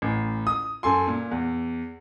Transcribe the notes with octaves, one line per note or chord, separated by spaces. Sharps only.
A1
D#6
F#2 A4 G#5 C6
A#2
E2